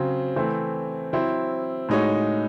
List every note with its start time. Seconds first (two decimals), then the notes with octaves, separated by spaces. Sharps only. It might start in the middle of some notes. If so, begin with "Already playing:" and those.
Already playing: C#3 F#3 C4
0.36 E3 A3 C4
1.13 F#3 C4 E4
1.89 A2 G#3 D#4 F#4 C#5